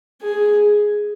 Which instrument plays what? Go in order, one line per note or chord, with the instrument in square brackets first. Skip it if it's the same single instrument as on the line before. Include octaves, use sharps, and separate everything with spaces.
[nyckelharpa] G#4